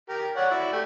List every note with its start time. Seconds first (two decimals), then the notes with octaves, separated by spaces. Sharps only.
0.09 G4 A#4
0.36 C#5 D5 F#5
0.51 E4 F#4 D5
0.73 A3 G4